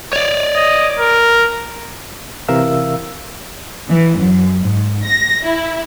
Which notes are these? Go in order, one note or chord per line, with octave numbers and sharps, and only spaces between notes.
C#5 D5
D#5
A#4
C3 E3 A#4 E5 F5 E6
E3
F#2
G#2
A#6
E4